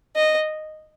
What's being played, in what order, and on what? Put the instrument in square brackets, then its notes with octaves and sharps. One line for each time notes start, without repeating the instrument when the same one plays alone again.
[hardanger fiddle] D#5